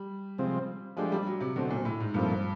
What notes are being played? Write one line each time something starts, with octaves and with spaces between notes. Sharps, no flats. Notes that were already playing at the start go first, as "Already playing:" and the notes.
Already playing: G3
C3 F3 G#3 C4
F3 G#3 A3 D4 G4
G3
F#3
C3
B2 D3 F#3 A3 C4
A#2
A2
G#2
G2 A#2 F3 A3 C4